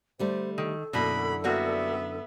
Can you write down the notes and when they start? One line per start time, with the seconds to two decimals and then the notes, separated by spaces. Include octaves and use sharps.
0.19 D3 G3 A3 C5
0.58 D#3 A4
0.93 F#2 B2 D3 A#3 E4 B5
1.44 G3 A#3 B3 F#4 E5